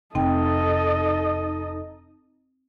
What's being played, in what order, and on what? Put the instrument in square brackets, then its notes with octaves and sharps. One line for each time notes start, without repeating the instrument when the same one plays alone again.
[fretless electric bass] F1 [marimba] C4 G5 [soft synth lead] D#4 [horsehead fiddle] A4 D#5